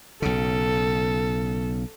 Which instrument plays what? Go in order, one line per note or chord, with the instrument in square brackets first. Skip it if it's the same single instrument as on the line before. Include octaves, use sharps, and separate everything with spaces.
[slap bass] B1 C#3 [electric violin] A4